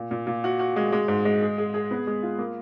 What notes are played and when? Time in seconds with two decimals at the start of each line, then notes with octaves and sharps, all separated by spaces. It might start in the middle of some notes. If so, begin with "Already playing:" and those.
Already playing: A#2
0.11 A#2
0.27 A#2
0.44 F#4
0.59 F#4
0.76 G#3
0.92 G#3
1.08 G#2
1.25 G#3
1.42 G#4
1.58 G#4
1.74 G#4
1.91 B3
2.07 G#3
2.23 F4
2.39 A#3